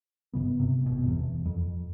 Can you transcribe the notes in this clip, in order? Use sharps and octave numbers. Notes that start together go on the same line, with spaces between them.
G1 E2 C#3 B3
G1 C3
F1 B2
G1 E2
F2